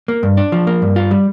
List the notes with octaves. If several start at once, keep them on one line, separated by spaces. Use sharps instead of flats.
A#3
G2
D4
F3
A#3
G2
F4
G3